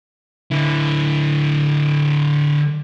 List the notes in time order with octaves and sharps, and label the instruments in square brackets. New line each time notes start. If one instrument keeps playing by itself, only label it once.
[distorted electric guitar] D3 E4